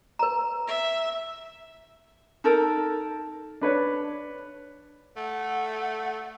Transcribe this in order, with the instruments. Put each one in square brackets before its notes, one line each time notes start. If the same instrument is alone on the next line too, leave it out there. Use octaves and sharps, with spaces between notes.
[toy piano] B4 A#5
[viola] E5
[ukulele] D#4 A4 A#4
[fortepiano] D4 B4 C#5
[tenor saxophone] A3 [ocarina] F#5